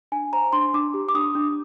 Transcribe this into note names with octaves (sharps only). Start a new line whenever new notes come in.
D4 G#5
C5 A#5
D4 C6
D4 D6
G4
D6
D4 D#6
D4